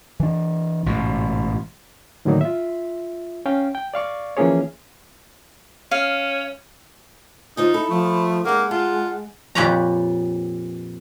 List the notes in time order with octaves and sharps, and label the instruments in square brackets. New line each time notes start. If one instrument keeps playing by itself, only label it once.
[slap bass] E3 D4
A1 G#2 B2
[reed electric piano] A2 D3 D#3 F#3 A#3 D#4
F4 E5
C#4 F5 G5
G5
D5 F5 C#6 D6
E3 F3 A#3 C#4 G#4 C#5
[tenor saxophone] C#4 [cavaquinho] F5
[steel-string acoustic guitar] D3 F4 C5 [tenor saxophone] D#4
[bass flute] E4 [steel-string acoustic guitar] A4 [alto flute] B5
[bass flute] F3 [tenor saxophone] A3
[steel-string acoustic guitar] C3 D#4 [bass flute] G#3 [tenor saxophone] A#3 [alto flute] F#5
[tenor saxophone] F4 [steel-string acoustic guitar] A5
[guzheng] F2 A#2 G4 B4 C#5 A#5